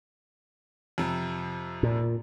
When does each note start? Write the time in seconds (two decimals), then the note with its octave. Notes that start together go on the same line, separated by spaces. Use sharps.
0.98 F2 C3
1.83 A#2